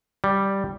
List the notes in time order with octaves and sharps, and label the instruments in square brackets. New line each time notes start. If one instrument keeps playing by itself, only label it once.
[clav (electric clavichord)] G3